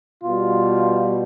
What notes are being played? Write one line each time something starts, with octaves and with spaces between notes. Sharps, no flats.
B2 G3 F4